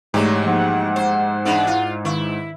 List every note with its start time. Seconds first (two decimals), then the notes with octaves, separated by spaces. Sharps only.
0.14 G#2 E3 F#3 A3 G4 C#5 D5 A#5
0.44 F3 A#3 D#4 F#5
0.96 C5
1.45 E2 G#3 D4 D#4 B5
1.67 E4 F4 F5
2.05 D#3 E4 F5 C#6